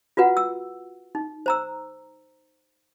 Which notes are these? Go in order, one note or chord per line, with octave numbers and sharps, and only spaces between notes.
F4 F#4 B4 F#5
E6
D#4
C5 A#5 E6